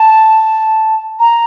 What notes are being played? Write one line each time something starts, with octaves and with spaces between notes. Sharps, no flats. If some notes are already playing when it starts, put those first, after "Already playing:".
Already playing: A5
A#5